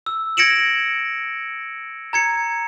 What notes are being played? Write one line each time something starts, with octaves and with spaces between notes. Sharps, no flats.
E6
G#6 A#6 C#7 D7 E7 F#7
A#5 G#6 C#7